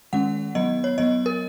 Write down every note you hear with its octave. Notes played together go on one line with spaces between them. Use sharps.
D#3 G#3 C#4 F#5
F#3 B3 D#5
C#5
F#3 B3 D#5
A#4